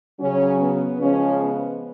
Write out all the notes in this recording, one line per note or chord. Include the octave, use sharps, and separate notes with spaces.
C#3 F#3 C#4
B3
C#3 F3 G#3 C#4
B3